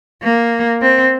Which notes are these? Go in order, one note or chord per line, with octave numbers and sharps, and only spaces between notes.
A#3
C4